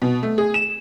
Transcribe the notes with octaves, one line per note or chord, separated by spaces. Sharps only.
B2
A3
G#4
E7